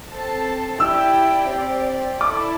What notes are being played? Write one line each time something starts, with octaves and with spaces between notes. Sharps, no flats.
C4 A4 C5 A5
E4 G4 D5 G5 E6
C4 G4 D5
E4 A4 D5 D6